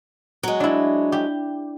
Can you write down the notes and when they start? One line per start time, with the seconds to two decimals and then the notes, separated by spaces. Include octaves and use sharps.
0.43 F#3 G#3
0.60 D4 E4
1.12 G4